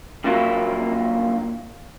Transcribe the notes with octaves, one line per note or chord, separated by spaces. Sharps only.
G2 A#2 F#3 A#3 E4